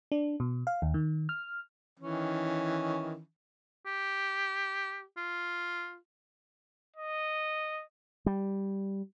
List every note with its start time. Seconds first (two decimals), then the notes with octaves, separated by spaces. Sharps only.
0.12 D4
0.40 B2
0.67 F5
0.82 D#2
0.94 D#3
1.29 F6
2.00 D#3 E3 C#4
3.86 G4
5.17 F4
6.96 D#5
8.26 G3